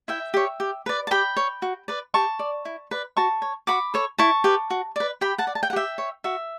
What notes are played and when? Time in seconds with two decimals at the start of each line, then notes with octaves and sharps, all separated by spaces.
0.08 E4 E5 G5
0.34 G4 C#5
0.60 G4
0.86 B4 D5
1.07 A5
1.11 G4 G5 B5
1.37 C#5
1.62 F#4
1.88 B4 D5
2.14 G4 A5 C#6
2.39 D5
2.65 E4
2.91 B4 D5
3.17 F#4 A5 C#6
3.42 C#5
3.67 F#4 B5 D6
3.94 A4 C#5
4.18 E4 A5 C#6
4.44 G4 B4
4.70 F#4
4.96 B4 D5
5.21 G4 G5 B5
5.38 F#5 A5
5.47 D5
5.55 A5
5.63 G5
5.70 F#5
5.73 G4 E5 G5
5.98 C#5
6.24 F#4 E5